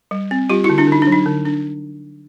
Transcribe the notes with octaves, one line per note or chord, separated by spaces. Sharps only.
G3
C4
G3 F4 G4
E4 F#4
D3
D4 E4
D3 D#4
D4
F#3
D#4
D3
D4